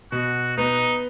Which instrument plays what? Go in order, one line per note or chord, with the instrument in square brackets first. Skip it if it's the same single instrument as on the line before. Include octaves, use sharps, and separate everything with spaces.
[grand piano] B2 [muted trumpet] F#4
[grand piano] B3 [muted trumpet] D#4